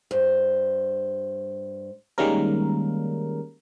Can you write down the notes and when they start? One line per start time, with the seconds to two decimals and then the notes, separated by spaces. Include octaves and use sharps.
0.11 G2 C5
2.18 D#3 G3 G#3 A#3 C#4 A#4